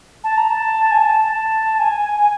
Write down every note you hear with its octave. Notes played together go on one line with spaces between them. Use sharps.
A5
A#5
A5
G#5
A5
A5
G#5